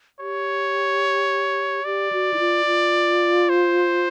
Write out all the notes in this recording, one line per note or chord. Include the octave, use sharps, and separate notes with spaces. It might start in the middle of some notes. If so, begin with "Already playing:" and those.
G4 C#5
G4 D5
F#4
E4
F4
F4
C5